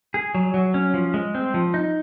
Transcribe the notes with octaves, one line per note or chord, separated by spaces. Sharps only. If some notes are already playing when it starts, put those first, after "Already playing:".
G#4
F#3
F#3
C#4
F3
G#3
C4
F3
D#4